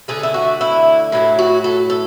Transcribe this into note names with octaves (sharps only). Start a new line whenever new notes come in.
D3 A3 G#4
E4
F#4
E4
A2 F#3 A3 E4
F#4
A4
A4